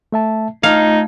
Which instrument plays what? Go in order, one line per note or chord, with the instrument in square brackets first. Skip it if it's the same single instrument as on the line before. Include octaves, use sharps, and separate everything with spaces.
[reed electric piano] A3 E5 A5
[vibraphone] A3 F4 [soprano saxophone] D#4 [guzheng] F5 [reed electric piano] G#6